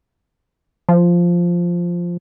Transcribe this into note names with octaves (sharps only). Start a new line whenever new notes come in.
F3